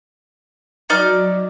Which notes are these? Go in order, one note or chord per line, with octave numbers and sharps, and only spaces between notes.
F#3 D#4 D5 F6